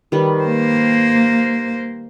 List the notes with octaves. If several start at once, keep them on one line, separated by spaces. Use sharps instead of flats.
D#3 G3 B4
A#3 C5